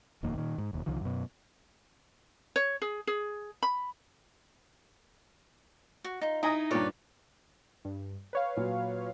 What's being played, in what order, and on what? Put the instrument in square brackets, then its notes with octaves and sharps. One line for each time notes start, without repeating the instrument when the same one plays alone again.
[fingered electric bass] D#1 F2 D#3 A#3
A#2 D#3
G#2
E1 D#2
C2 D3 D#3 F3
F#2 B2
[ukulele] C#5
G#4
G#4
B5
[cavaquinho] F#4
D#4 F4
[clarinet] D#4 [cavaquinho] E4 A#5 [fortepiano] D#5 G#5 D#6
[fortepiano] G2 A#2 [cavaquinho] B4 C#5 D5
[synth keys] G2
B4 C#5 F5
[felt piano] A#2 F#3